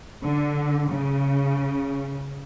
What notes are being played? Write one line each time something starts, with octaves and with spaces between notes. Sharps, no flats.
D3
C#3